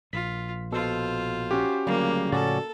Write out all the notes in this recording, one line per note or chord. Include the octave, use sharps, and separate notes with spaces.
A#1 F4 B6
B2 F4 A4 C5
C#4 F#4 G4
D2 C#3 F#3 G3 A#3
A2 C#3 F3 C#4 F#4 A4 D5